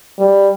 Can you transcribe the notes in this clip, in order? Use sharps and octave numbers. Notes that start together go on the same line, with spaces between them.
G3